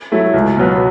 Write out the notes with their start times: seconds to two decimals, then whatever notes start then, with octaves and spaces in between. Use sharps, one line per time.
0.12 F#3 A3 E4
0.34 C#2
0.56 B2 F#3 B3